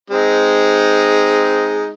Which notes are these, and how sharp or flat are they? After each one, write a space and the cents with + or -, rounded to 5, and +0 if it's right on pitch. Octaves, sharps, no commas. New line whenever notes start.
G#3 +0 C4 -15 D#4 +0